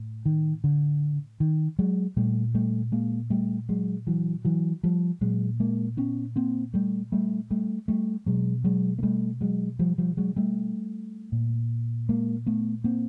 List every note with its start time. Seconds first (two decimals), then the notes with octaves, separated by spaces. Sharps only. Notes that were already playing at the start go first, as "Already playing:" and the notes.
Already playing: A2
0.26 D#3
0.64 D3
1.40 D#3
1.79 F#3 G#3
2.17 A#2 G3 A3
2.54 G3 A3
2.92 G#3 A#3
3.30 G3 A3
3.69 F#3 G#3
4.07 E3 F#3
4.45 E3 F#3
4.84 F3 G3
5.21 A#2 F#3 G#3
5.60 G#3 A#3
5.97 B3 C#4
6.36 A#3 C4
6.74 G3 A3
7.12 G3 A3
7.51 G3 A3
7.88 G3 A3
8.26 B2 F#3 G#3
8.64 F#3 G#3
8.99 A#3
9.03 G3 A3
9.41 F#3 G#3
9.79 F3 G3
9.98 F3 G3
10.17 F#3 G#3
10.36 G3 A3
11.32 A#2
12.09 G#3 A#3
12.46 A3 B3
12.84 A#3 C4